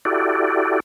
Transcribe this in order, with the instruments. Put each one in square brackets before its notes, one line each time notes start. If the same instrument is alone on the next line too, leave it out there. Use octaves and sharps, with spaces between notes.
[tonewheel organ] E4 F#4 G4 A4 D5